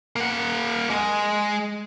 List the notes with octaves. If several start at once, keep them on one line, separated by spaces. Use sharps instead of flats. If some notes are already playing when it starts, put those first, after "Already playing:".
A#3 F#5
G#3